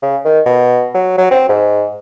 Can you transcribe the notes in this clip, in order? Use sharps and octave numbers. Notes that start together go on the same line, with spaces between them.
C#3
D#3
B2
F#3
F#3
C4
G#2